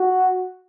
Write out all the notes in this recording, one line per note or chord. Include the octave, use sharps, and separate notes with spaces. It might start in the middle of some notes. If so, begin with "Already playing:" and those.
Already playing: F#4